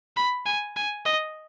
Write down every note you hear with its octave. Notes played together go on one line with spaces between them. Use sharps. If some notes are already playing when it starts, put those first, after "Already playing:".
B5
G#5
G#5
D#5